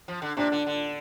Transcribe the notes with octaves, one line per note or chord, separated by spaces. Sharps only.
F3
D3
C3 D4
D3
D3